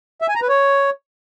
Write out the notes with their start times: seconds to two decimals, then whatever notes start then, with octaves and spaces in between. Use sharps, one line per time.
0.22 E5
0.28 G#5
0.35 A#5
0.42 B4
0.49 C#5